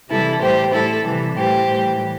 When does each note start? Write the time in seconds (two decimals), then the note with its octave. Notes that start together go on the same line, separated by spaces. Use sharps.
0.10 C3 E3 G3 E4 A4
0.41 A2 G3 G4 C5
0.73 A2 G3 E4 A4
1.06 C3 E3 G3
1.37 A2 E3 G3 G4 C5
1.69 A2 E3 G3